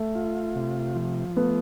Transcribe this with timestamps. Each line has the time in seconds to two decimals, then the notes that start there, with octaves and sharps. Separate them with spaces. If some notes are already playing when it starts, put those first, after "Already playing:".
Already playing: A3
0.15 F4
0.55 C3
0.95 F3
1.37 A3 B3